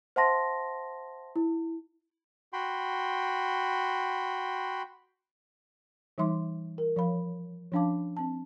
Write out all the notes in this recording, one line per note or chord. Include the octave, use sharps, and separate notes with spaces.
C5 E5 F#5 A5 C6 A#6
E4
F#4 G5 B5 C6
E3 G3 D#4 E5 C6 D6
A#4
F3 C#5 F5 B5
F3 C#4 D4 F5 A5 D6
C4 A5